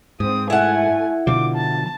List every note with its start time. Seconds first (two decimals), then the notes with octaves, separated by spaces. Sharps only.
0.20 G#2 C4 D#6
0.50 A3 E4 F#5 G#5
1.27 B2 D3 F3 D6
1.56 A5